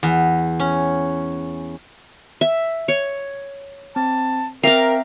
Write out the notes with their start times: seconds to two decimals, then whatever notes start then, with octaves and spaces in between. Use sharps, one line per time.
0.03 E2
0.60 C#4
2.41 E5
2.88 C#5
3.96 C4 A5
4.63 C4 A#4 E5 F5 G5 A#5